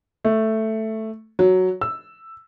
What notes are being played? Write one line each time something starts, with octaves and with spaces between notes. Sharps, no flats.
A3
F#3
E6